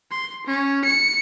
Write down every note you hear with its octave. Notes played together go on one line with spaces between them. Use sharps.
C6
C#4
C#7